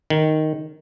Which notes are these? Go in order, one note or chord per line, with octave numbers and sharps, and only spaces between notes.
D#3